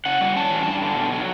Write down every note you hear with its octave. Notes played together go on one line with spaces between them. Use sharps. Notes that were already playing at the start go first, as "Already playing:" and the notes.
C#3 F#5
G3
C#4 A5
E3
G2
D3
B2
F#3